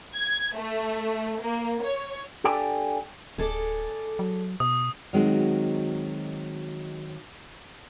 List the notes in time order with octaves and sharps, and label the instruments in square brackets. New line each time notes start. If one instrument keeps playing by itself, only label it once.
[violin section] G#6
A3
A#3
C#5
[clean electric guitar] D4 G4 A4 D5 G5 G#5
[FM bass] D1 [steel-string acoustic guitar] G#4 A4 D5
[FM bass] F#3
[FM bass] B2 [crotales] D#6
[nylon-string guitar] D#3 F#3 G#3 C4 F#4